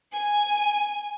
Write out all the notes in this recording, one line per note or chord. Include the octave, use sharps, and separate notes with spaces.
G#5